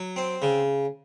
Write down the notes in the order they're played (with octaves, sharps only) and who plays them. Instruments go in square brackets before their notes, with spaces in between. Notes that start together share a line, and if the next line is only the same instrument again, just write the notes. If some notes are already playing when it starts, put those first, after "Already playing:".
Already playing: [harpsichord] F#3
C4
C#3